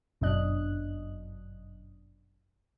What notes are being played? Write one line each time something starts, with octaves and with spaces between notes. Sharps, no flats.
G1 F#2 B2 D4 D#5 F#6